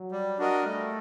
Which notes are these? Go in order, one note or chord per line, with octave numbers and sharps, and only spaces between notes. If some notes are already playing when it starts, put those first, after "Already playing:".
Already playing: F#3
G3
D4 F#4 A#4 D#5
G3 A3